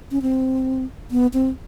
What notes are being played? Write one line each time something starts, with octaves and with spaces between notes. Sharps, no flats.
C#4
C4
B3
C4